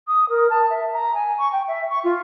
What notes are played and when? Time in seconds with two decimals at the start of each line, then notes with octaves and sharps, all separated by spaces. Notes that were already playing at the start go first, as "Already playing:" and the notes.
0.07 D#6
0.29 A#4
0.50 A5
0.70 E5
0.93 A#5
1.14 G#5
1.38 C#6
1.52 G5
1.68 E5
1.90 C#6
2.04 F4